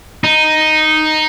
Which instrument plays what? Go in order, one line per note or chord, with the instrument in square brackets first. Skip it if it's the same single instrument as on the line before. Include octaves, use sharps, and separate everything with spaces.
[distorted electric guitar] D#4